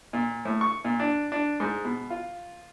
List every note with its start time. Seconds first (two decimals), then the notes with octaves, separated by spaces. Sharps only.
0.13 A#2
0.45 A2
0.61 C#6
0.85 A#2
1.00 D4
1.32 D4
1.60 G#2
1.84 B2
2.10 F4